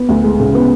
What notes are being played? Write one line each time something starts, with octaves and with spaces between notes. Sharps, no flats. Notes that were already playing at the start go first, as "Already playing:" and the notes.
Already playing: B3
D2
G#3
C#3
B3